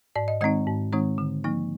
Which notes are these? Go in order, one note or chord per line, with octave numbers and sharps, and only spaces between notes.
G#2 D5
D#5
D#3 G#3 C4 D#4 D#5
G#2
D#3 G#3 C4 D#4
D3
F3 A#3 D#4